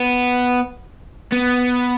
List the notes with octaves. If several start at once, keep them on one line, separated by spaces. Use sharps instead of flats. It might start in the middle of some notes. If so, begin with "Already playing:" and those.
Already playing: B3
B3